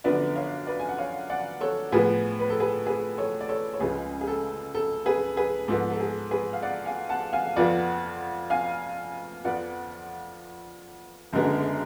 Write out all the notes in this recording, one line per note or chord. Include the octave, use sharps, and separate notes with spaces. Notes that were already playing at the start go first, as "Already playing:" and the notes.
F#2 D3 F3 B3 D4 B4 D5
C#5 F5
B4 D5
G#5
F#5
C#5 F5
D5 F#5
A4 C#5
A2 F3 B3 G#4 B4
B4
A4
G#4 B4
G#4 B4
A4 C#5
D5
A4 C#5
C#5
C#2 C#3 F3 G#3 G#4 B4
G#4
A4
A4
G#4 B4
G#4 B4
G#2 F3 B3 A4
A4
G#4
G#4 B4
F5
D5 F#5
F5 G#5
F#5 A5
F5 G#5
F2 F3 B3 F4 D5 F#5
F5 G#5
F2 F3 B3 F4 D5 F#5
F#1 F#2 D3 G#3 B3